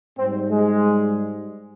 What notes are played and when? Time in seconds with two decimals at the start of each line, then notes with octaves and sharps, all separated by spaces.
0.18 G#2 G3 C4
0.50 G#3